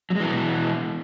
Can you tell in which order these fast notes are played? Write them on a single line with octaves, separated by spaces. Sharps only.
F#3 G#3 E3 B2